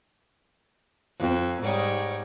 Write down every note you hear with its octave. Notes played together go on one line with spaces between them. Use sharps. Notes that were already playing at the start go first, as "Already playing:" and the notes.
F2
G#2 G3 C#5